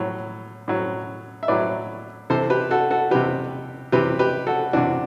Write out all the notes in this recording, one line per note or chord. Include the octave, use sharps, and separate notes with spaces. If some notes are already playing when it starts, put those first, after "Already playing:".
Already playing: A2 F#3
A2 F#3
E5
A2 F#3 B4 D5
C3 E3 A4 C5
G4 B4
F#4 A4
F#4 A4
C3 E3 G4 B4
C3 E3 G4 B4
G4 B4
F#4 A4
C3 E3 D4 F#4